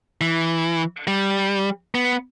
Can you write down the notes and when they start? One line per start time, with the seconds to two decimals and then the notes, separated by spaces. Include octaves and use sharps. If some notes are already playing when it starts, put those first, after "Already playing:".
0.21 E3
1.07 G3
1.95 B3